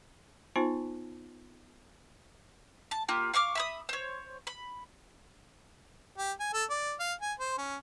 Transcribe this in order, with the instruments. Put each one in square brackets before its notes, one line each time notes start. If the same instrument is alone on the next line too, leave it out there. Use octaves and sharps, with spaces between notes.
[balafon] B3 D#4 F4 C5 A5
[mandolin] A5
A#3 F4 G4
F5 C#6 D6 F6
E5 B5 D#6
C5 C#5
B5
[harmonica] G4
G#5
A4
D5
F5
G#5
C5
C#4